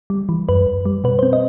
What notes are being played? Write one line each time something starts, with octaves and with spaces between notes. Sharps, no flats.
G3
E3
F#2 B4
F#2
G3
B2 B4
C5
C4
D#5